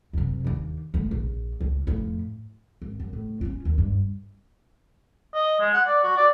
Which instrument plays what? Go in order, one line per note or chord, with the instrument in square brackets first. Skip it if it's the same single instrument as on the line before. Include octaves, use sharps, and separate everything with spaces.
[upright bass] F#2 C3
D#2 D4
G#3 A3
A#1
C#2
F2 A2
G#1
F#2
A2
C#4 F4
D#2
G2
[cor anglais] D#5
G#3
F#5
D5
F#4
D5